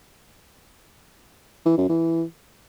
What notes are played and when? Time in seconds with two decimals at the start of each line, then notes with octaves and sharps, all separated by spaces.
1.66 E3
1.77 F#2
1.89 E3